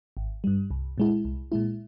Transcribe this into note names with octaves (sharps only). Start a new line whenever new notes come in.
G#1
G2 G3
C2
A#2 G#3 E4
C2
A#2 G#3 E4